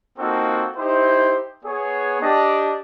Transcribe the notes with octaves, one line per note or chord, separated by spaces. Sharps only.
A#3 C4 D#4 F4 F#4 A4
D#4 E4 G4 C5
B3 G#4 C#5
D4 G4 D#5